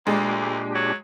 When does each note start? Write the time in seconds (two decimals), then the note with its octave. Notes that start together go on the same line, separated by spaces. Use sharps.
0.07 D2 A#2 G#3 D4 G4
0.75 F#3